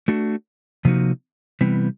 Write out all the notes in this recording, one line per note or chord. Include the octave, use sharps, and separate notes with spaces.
A3 D4 F#4
C3 F3 A#3 D#4 F#4
C3 E3 G3 B3